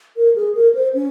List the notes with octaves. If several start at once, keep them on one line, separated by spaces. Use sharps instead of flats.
A#4
G#4
A#4
C5
C#4